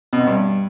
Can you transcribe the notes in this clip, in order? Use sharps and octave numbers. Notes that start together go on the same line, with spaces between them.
B2
C3
G2